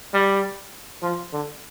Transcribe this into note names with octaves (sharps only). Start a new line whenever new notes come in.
G3
F3
D3